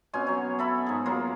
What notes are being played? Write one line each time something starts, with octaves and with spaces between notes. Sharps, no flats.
B2 C4 C#4 G#5
F#3 C#5
A4 E5 B5
G#2 G#4
F#3 A#3 F4